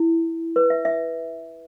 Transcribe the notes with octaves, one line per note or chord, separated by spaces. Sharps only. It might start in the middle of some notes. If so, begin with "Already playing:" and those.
Already playing: E4
B4
E5
E5